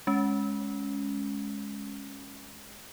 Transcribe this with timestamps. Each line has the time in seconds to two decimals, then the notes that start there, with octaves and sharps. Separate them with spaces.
0.07 G#3 C#4